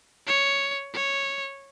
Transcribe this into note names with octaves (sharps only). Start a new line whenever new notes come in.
C#5
C#5